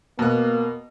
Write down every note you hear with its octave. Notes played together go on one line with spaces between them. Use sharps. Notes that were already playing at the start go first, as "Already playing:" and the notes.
B2 A#3 F#6